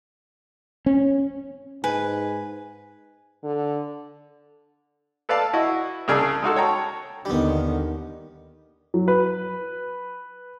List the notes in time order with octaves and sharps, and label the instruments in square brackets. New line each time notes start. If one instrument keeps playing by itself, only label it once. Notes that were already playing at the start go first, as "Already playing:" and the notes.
[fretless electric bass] C#4
[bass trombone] G#2 [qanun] B4 [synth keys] G#5
[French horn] D3
[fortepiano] A4 B4 D5 F5 A5
E4 F#4 D#5
C2 C#3 G#4 D5 A5 E6
G#3 D#4 F#4 A4
C#5 G5 A5 A#5
[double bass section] D#2 D3 D#3 [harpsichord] G3 B3
[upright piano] F#3
B4